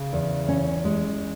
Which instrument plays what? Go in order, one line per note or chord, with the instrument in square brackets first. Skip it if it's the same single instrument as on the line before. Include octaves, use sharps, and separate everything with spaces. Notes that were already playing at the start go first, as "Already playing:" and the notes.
Already playing: [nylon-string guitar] C#3
E2
C#4
G#3